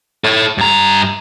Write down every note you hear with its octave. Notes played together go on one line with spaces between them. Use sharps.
A4 C#5
G2 A#5